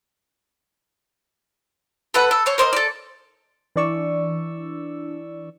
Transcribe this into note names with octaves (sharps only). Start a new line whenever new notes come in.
A4 B4 F#5
A4
C5 C#5
A#4 C5 D5 D#5
A4 D5
E3 D4 D5 C#6 E6